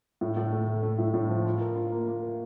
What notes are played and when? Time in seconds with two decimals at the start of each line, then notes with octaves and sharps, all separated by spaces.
0.21 A2
0.37 A2
0.52 A3
0.68 A3
0.83 A3
0.98 A2
1.14 A2
1.29 F3
1.45 F4
1.60 A#4
1.76 F4
1.92 A#3
2.08 A#3
2.22 A#4